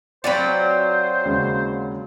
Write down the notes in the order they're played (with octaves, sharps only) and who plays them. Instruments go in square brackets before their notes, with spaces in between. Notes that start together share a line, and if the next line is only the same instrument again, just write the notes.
[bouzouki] F#3 C4 F4 [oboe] C5 [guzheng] D5 B5
[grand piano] D#2 C#3 G#3